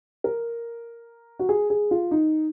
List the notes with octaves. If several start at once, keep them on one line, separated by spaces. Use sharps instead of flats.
A#4
F#4
G#4
G#4
F4
D#4